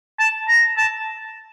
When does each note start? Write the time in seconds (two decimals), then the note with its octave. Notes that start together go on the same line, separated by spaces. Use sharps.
0.19 A5
0.48 A#5
0.77 A5